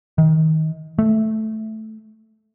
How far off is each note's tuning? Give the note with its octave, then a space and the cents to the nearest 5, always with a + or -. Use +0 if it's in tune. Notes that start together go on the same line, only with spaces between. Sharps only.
D#3 +25
A3 -5